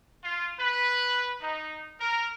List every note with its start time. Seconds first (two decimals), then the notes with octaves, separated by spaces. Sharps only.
0.23 F4
0.59 B4
1.41 D#4
2.00 A#4